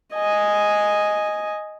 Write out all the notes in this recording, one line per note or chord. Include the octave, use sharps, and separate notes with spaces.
D#5 G#5